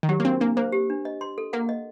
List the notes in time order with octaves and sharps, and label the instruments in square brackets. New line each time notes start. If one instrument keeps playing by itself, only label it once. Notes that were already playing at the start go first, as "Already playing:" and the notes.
[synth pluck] D#3
[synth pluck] F#3 [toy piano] G4
[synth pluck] A#3
[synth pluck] C4 [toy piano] D4
[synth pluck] A#3 [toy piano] D4
[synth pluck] A#3 [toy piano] C5
[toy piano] G4
D4
D#5
C6
A4
[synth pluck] A#3 [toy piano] F#5
[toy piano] D#5